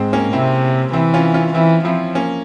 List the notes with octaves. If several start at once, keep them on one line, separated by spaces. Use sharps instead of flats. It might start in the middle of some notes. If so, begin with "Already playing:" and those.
Already playing: G#2 G#3 C4
A#3 C#4
C3 C4 E4
E3 C4 E4
C#4 F4
C#4 F4
E3 C4 E4
F3 C4 E4
A#3 C#4